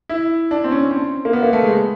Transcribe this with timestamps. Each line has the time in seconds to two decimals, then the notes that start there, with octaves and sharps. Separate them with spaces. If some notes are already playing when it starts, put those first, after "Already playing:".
0.09 E4
0.51 D4
0.64 C4
0.71 C#4
0.91 C4
1.25 A#3
1.33 B3
1.43 A#3
1.53 A3
1.63 G#3